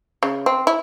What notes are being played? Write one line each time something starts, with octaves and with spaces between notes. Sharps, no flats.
C#3
C4
E4